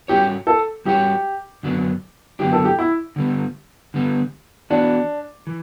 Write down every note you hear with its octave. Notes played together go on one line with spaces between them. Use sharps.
G3 C#4 F#4 G4 C#5
A4
G3 C#4 F#4 G4 C#5
F#2 D3 F#3 B3 D4
F#2 D3 F#3 B3 D4 G4
A4
G4
E4
D3 G3 B3
D3 G3 B3
E3 B3 D4 F#4
E3